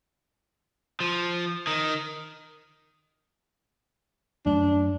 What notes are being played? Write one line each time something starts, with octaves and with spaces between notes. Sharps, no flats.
F3
D#3
F#2 F#3 A3 D4